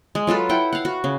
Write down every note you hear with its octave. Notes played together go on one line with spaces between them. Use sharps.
G#3
F#3 F4 A4 B4
E4 F#5 G5
F5 F#5
F#4
C#3